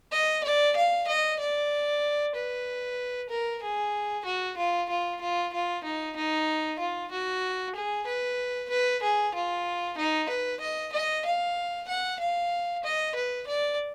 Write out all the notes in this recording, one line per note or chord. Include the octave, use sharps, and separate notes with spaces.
D#5
D5
F5
D#5
D5
B4
A#4
G#4
F#4
F4
F4
F4
F4
D#4
D#4
F4
F#4
G#4
B4
B4
G#4
F4
D#4
B4
D#5
D#5
F5
F#5
F5
D#5
B4
D5